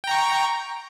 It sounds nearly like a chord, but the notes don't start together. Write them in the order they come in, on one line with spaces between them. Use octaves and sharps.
G5 A#5 C#6